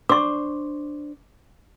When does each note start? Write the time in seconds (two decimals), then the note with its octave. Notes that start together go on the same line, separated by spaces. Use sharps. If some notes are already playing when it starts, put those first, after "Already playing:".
0.09 D4 C5 C#6 D6